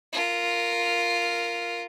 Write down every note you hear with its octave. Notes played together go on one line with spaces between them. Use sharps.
F4 A#4